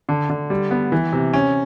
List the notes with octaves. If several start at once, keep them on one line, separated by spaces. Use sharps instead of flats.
D3
D3
G3
B3
E3
C3
C#4